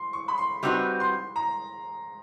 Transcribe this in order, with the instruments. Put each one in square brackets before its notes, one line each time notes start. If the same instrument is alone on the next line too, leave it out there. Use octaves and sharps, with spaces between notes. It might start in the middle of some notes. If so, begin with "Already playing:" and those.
Already playing: [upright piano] C6
C#6
B5
C6
[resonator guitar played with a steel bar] G3 C4 D#4 F#4 B4 [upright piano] C6
[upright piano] C6
A#5